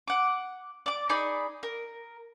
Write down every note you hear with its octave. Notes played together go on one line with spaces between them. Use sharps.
F#5 D6
D5 D6
D#4 G#4 D5 B5
A#4